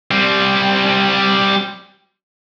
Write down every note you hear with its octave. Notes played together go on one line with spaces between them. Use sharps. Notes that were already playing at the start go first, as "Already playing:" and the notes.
G3 C4